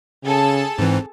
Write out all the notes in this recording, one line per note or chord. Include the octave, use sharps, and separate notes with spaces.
C#3 G#4 A4 A5
G#2 E3 C4